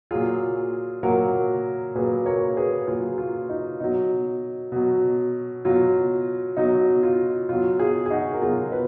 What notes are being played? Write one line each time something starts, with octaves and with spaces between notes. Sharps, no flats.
A#2 F#3 F4 G#4
A#2 F#3 F#4 A#4
A#2 F#3 G#4 B4
A#4 C#5
G#4 B4
A#2 F#3 F4 G#4
F4
D#4
B2 F#3 D#4
B2 F#3
B2 F#3 F4
B2 F#3 D#4
F4
B2 F#3 F4
F4 G#4
G#4
D#4 F#4
A#4
B2 F#3 F4 G#4
B4